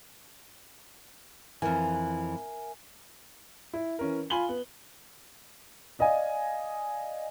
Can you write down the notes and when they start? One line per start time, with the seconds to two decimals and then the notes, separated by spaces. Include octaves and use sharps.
1.62 F2 E3 A#4 E5 G#5
3.73 E4
3.99 E3 C#4 A#4
4.30 F4 G#5 B5 F#7 G7
4.49 B3
5.99 D5 D#5 F5 G#5